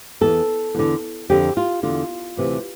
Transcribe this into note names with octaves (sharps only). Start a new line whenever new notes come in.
E2 E3 A4
E2 D3
F2 D3 G4
F4
E2 D3 F4
D2 C3 E3